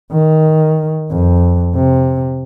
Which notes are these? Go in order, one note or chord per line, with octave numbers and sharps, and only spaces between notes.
D#3
F2
C3